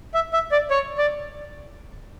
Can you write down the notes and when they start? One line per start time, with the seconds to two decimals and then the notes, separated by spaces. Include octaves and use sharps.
0.14 E5
0.33 E5
0.52 D5
0.71 C#5
0.98 D5